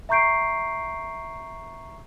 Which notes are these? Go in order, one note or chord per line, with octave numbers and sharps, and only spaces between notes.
E5 A#5 C#6 G6 C7 D7